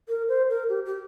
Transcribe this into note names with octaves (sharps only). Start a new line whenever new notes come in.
A#4
C5
A#4
G4
G4